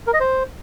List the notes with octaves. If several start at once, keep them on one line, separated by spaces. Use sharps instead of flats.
A#4
D#5
C5